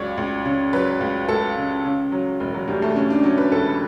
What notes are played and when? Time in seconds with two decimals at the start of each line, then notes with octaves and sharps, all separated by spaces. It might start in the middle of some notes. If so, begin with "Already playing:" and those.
Already playing: C#2 F#3 C#5 D5
0.18 C#2
0.45 C#3
0.73 F#3 B4
1.01 C#2
1.29 C#2 A4
1.57 C#3
1.85 C#3
2.12 F#3
2.40 E1
2.54 F#3
2.68 D2 G3
2.82 A3
2.95 C#3 C#4
3.10 D4
3.23 F#3 C#4
3.38 B4
3.52 E1 A4